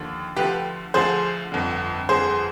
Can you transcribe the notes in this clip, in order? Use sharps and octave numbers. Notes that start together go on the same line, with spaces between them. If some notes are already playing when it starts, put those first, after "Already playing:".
Already playing: D#2 D3 F3
D2 D3 F3 G4 B4
D2 D3 F3 G#4 C5
G1 F2 D3
G1 F2 D3 G#4 C5